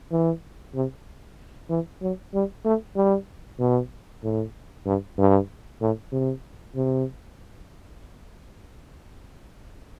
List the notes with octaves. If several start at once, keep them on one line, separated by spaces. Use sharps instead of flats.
E3
C3
E3
F#3
G3
A3
G3
B2
A2
G2
G2
A2
C3
C3